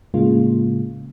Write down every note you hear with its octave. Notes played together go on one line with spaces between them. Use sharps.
A2 C#3 G#3 A#3 F4